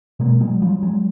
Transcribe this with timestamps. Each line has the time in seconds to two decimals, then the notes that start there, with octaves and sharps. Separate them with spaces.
0.20 B2 G#3 A#3
0.41 F#3 G#3
0.62 F3 G3
0.83 F#3 G#3